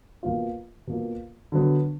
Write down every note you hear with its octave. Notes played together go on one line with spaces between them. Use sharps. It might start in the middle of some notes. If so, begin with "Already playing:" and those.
B2 A#3 F4
B2 A#3 F4
D3 F#3 B3